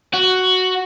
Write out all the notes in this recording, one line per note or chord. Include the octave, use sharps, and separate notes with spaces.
F#4